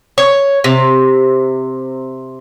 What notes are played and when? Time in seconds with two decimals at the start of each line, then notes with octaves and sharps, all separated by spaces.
0.18 C#5
0.64 C3